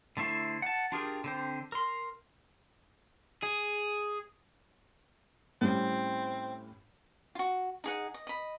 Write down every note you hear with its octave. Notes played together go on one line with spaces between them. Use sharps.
D3 A3 E4 C5
F#5 A5
D4 F4 G4 G#4 A#4
D3 C4 C5
A#4 C6
G#4
A2 G3 C4 C#4
F4 F#4
D#4 G#4 F#5
D#5
D#5 B5